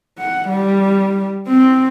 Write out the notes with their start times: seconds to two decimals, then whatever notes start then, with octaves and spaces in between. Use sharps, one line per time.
0.18 F#5
0.48 G3
1.47 C4